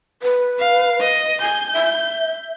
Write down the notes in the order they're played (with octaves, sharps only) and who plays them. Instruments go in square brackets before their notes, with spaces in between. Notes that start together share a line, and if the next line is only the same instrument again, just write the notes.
[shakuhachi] B4
[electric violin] F5
D#5
[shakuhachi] G#5 [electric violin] G6
[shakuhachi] E5